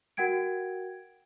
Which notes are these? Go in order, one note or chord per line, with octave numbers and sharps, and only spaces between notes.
F#4 A#4 F#5 G5 G#6 D7